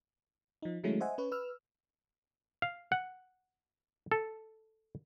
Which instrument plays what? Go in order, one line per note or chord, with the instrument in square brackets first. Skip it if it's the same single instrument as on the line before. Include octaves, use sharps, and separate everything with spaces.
[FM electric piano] F3 D#4
D#3 F#3 G#3 A3 C#4 E4
C5 D#5 E5 F#5 G#5
C#4 B4 C#5
B4 E6 F6
[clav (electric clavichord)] F5
F#5
A4